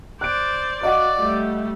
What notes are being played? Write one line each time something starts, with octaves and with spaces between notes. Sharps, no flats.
C5 D5 F#6 D7
F#4 D5 D#5 F5 F#5
G3 A3